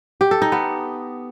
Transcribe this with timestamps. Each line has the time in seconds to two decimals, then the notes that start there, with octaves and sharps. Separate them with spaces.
0.21 G4
0.31 A4
0.42 D#4
0.52 B3